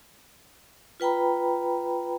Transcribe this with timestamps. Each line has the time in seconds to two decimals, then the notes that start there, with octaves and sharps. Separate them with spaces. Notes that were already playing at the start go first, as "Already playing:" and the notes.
1.00 F4 B4 G5 A#5 B5